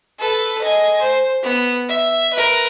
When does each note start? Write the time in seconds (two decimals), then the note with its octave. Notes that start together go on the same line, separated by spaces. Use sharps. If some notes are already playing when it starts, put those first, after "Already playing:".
0.19 A4 B4
0.62 D#5 G#5
1.02 C5
1.43 B3
1.89 E5
2.34 A#4 B4